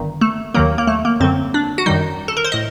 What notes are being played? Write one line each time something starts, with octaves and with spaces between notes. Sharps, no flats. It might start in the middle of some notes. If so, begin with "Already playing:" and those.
Already playing: G1 G2 D#3
A3
D#2 D#3 F#3 A#3
A#3
A3
A#3
F#2 D3 F#3 C4
D4
F#4
F#2 D#3 G3 D#4
A4
A#4
C5
A2 D#5